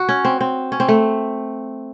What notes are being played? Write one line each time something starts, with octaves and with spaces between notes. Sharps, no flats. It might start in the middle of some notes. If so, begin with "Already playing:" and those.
Already playing: F#4
C#4
C4
C4
C#4
C4
A3